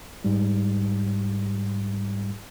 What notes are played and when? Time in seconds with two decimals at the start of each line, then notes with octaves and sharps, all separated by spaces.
0.24 G#2 G3